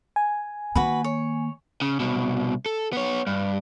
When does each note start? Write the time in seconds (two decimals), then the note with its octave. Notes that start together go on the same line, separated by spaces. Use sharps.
0.16 G#5
0.75 D#3 A#3 F#4 B4 B5
1.04 C#5
1.82 C#3
2.00 C2 B2
2.66 A4
2.93 B3 C#5
3.27 G2